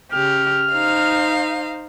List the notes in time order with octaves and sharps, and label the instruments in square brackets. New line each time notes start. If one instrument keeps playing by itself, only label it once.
[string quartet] C#3 G4 [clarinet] F6
[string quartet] D#4 C5 F5